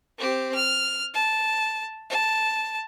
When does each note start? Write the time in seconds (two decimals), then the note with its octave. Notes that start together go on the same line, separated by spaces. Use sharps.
0.18 C4 G4
0.54 F6
1.14 A5
2.10 A5